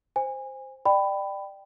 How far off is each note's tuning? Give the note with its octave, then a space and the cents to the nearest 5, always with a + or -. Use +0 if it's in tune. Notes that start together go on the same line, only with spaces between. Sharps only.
C5 +0 G#5 -25
D5 +25 G5 +0 B5 +10